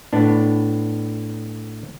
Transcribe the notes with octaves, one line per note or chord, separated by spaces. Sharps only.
A2 B3 D4